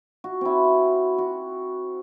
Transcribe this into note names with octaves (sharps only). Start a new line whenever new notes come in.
F#4
C4 E4
F#4